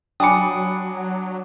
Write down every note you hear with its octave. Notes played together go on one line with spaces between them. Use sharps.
F#3 D4 G5 G#5 B5 D6 D#6 C#7